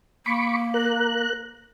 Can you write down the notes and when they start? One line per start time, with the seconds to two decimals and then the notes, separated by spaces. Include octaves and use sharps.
0.26 A#3 B5 C#6 D6
0.74 A#4 F#6